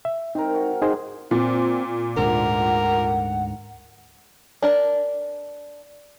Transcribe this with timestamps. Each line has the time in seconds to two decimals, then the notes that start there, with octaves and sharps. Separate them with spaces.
0.05 E5
0.35 C4 D#4 A#4
0.54 F#4
0.82 G#2 G#3 D#4 G#4 C5
1.31 A#2 C4
2.17 D2 G#2 D3 A#4 F#5
4.62 D4 A#4 D5